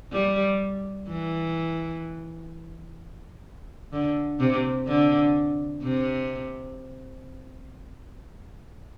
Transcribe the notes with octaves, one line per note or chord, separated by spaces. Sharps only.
G3
E3
D3
C3
D3
C3